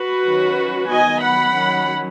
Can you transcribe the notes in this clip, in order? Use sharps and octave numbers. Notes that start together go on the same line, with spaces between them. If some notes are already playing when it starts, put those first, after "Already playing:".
Already playing: F#4 B4
D#3 F#3 C#4
D#3 F#3 B3 D#5 G#5
F#5 B5
D#3 F#3 C#4